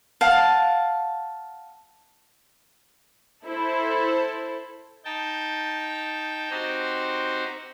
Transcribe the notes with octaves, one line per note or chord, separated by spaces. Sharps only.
F5 F#5 A5
E4 A4 C5
D#4 G5 A5
C4 D#4 F#4 G4 C5